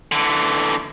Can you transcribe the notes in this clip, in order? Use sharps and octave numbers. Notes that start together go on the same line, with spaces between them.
D3 E3